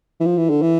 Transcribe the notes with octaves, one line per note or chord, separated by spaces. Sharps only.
E3
F3
E3
D3
E3